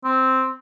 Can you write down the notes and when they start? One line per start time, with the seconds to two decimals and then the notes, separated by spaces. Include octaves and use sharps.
0.04 C4